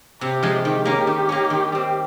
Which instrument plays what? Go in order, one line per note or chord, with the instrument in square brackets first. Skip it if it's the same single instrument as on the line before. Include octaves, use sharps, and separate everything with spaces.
[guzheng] C3 [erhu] G4
[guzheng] F3 G#3
[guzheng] D#3 [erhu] G4
[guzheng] A#3 C#4
D#3
A#3 C#4
D#3
G3 C4